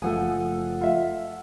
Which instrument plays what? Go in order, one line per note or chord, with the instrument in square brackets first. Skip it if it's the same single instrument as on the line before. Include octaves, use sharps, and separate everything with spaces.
[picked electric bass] F#1 F3 A3 [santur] A4 F#5 D#6 [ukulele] G#5
[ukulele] F4 E5